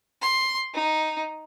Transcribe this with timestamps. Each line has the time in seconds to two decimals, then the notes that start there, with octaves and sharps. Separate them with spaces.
0.22 C6
0.74 D#4